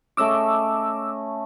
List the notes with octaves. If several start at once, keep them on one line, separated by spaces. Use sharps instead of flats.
A3 C#4 D#5 D6 E6